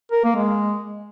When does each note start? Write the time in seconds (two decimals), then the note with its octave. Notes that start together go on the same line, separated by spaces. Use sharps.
0.12 A#4
0.24 A#3
0.36 G#3